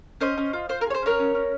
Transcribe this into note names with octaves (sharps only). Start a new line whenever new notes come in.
C#4 C5 D#5
C#4
F4
F4 C5
A#4
G#4 C#5
C5
C#4 A#4 C#5
C#4
C#4